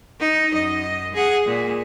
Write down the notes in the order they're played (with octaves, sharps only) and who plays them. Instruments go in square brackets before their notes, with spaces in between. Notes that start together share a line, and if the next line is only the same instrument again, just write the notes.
[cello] D#4
F#2 D#5
G#4 F#5
A#2